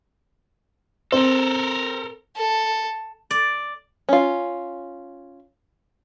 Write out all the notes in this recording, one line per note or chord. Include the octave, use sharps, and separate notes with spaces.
C4 A4 A#4
A4
D5
C#4 F4